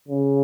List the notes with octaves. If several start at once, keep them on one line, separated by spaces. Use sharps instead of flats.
C#3